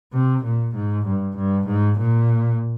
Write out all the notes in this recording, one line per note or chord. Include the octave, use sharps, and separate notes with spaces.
C3
A#2
G#2
G2
G2
G#2
A#2